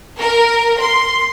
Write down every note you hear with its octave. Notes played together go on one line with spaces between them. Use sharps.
A#4
C6